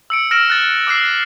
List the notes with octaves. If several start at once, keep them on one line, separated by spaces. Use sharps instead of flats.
E6 C#7 D7
E6 F6 A#6 D7 E7
F#6 A6
D6 E6 F#6 C7